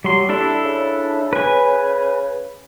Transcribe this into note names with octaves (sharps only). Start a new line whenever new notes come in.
F#3 G3 C6
G3 D4 E4 A4
C#3
B4 G#5